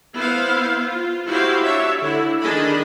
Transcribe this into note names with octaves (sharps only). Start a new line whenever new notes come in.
B3 E4 C5 F5
F4
E4 F#4 G4 C5 F5
D4 C#5 E5
D3 E4
D#3 D4 G#4 D#5 B5